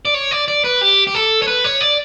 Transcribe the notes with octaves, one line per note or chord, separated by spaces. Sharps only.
D5
C#5
D5
D5
B4
G4
G4
A4
C#5
B4
C#5
D5